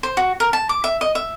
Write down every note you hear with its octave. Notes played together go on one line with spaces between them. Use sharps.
C5
F#4
A#4
A5
D6
E5
D#5
E5